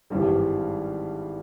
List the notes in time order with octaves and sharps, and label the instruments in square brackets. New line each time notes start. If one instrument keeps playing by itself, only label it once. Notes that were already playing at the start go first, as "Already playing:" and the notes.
[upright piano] G#1 G2 E3 G3